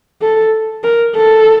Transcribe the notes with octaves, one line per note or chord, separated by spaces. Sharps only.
A4
A#4
A4